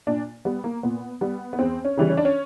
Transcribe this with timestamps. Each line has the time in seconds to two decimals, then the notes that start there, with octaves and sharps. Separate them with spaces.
0.07 A#2 D4
0.45 G3 B3
0.64 A#3
0.83 A#2 B3
1.21 G3 B3
1.53 B3
1.59 E2 C4
1.85 C#4
1.97 C#3 E3 G3
2.10 C#4
2.17 D4
2.25 C#4